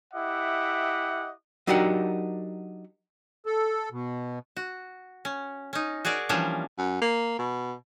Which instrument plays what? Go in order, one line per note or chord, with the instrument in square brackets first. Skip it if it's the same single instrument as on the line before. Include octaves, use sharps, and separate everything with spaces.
[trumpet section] E4 G4 D#5 E5 F#5 D6
[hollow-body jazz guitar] F#3 D4 D#4 G4 A#4 F#5
[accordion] A4
B2
[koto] F#4
C#4
C#4 D#4
F#4 G#4 A#4 D5
E3 F3 G3 A#3 C#4 D4
[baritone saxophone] F#2
A#3
B2